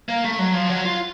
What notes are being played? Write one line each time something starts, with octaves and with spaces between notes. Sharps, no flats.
A#3
A3
F#3
F3
F#3
F4